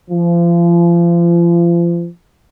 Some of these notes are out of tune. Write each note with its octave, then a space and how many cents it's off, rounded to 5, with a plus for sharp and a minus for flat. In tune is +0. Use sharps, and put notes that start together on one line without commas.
F3 -35